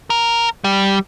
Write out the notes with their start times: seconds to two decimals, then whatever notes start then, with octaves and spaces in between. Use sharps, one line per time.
0.10 A#4
0.64 G3